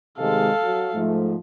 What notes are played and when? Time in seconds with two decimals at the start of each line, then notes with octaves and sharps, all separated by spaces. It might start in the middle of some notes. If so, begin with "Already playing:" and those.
0.18 C3 D#3 G#3 A4 F5
0.62 F#3
0.94 G#2 F3 A3